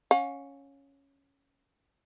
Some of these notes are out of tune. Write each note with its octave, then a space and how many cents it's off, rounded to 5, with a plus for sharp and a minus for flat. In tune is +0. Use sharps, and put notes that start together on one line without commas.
C#4 +0 F5 +40